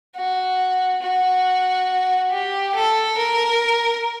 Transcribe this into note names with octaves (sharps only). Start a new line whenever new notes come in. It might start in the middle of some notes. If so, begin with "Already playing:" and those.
F#4
F#4
G4
A4
A#4